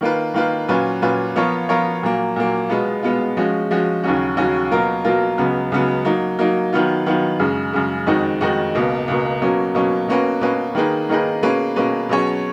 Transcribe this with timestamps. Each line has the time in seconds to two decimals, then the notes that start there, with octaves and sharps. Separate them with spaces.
0.01 D#3 A#3 F4 B4
0.34 D#3 A#3 F4 B4
0.68 A#2 F#3 C#4 F4 B4
1.02 A#2 F#3 C#4 F4 B4
1.36 F3 B3 F4 A#4 C#5
1.69 F3 B3 F4 A#4 C#5
2.03 A#2 F#3 A#3
2.36 A#2 F#3 A#3
2.69 B2 G#3 B3 F4
3.03 B2 G#3 B3 F4
3.37 F3 G#3 C#4 F#4
3.71 F3 G#3 C#4 F#4
4.03 D#2 C#3 F#3 C#4 F#4
4.37 D#2 C#3 F#3 C#4 F#4
4.71 B2 F#3 A#3 F4 A#4
5.04 B2 F#3 A#3 F4 A#4
5.38 C#2 C#3 F#3 B3
5.72 C#2 C#3 F#3 B3
6.05 F#3 A#3 D#4
6.39 F#3 A#3 D#4
6.73 D#3 F#3 B3 F4
7.06 D#3 F#3 B3 F4
7.40 F#2 C#3 G#3
7.73 F#2 C#3 G#3
8.06 F2 D#3 G#3 D#4 F#4
8.41 F2 D#3 G#3 D#4 F#4
8.75 C#2 B2 A#3
9.08 C#2 B2 A#3
9.42 B2 F#3 A#3 C#4
9.75 B2 F#3 A#3 C#4
10.08 B2 A#3 C#4 F#4 B4
10.41 B2 A#3 C#4 F#4 B4
10.75 D#3 A#3 D#4 G#4 B4
11.09 D#3 A#3 D#4 G#4 B4
11.42 B2 A#3 C#4 G#4 B4
11.76 B2 A#3 C#4 G#4 B4
12.09 B2 F#3 C#4 G#4 C#5